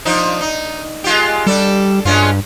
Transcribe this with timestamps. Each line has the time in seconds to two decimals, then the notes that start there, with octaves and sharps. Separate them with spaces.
0.05 F3 D4 D#4
0.41 D#4
1.04 G#3 F4 G4
1.47 G3 D4 A4
2.05 G2 G#3 C#4 F4